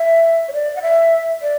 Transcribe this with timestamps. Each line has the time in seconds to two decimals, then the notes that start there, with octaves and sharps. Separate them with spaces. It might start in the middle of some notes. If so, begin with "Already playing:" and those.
Already playing: E5
0.48 C#5
0.53 D5
0.76 F#5
0.82 E5
1.42 D5